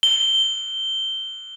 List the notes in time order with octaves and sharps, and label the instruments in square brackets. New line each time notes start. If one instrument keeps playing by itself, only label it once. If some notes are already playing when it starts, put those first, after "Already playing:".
[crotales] G7